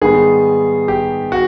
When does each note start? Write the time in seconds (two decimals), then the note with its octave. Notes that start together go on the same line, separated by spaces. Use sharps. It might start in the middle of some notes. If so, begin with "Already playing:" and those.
0.01 G#2 D#3 G3 B3 G#4
0.88 G4
1.32 F#4